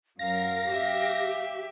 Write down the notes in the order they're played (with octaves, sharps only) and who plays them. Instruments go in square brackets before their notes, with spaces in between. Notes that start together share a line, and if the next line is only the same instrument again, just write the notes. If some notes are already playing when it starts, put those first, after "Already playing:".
[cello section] F#2 F#3 A#4 [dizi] F5 [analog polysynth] A#6
[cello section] G4 [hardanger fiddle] E5